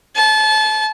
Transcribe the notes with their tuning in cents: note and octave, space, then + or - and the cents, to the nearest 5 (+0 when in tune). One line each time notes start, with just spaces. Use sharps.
A5 -30